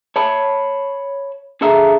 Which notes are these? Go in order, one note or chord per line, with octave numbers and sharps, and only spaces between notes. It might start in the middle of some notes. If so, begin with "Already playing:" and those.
C#5 A5 B5
D4 G#4 A4 E5 F5 A#5